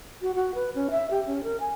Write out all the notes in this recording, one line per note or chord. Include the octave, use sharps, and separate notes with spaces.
F#4
F#4
B4
C#4
E5
G4
C#4
A#4
G#5